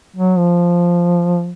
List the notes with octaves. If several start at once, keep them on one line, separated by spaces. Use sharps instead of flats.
F#3
F3